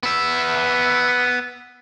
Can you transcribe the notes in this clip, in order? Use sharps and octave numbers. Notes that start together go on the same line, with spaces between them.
B3 E5